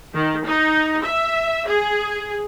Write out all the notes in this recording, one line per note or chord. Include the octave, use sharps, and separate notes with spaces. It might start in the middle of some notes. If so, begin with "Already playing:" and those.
D#3
D#4
E5
G#4